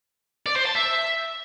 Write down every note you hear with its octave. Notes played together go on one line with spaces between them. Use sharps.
D5
C5
A5
E5